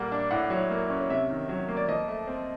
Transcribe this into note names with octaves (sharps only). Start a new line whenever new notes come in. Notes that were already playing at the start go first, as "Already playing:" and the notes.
Already playing: A#2 G3 A#3 F#5
D4
A2 F#5
F#3
A#3
C#4
C3 E5
D#3
F#3
A#3
D5
F3 D#5
A3
C4